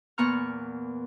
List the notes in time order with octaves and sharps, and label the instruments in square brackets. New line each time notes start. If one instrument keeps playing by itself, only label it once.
[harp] E2 A#2 B3 A#5 C#6 F6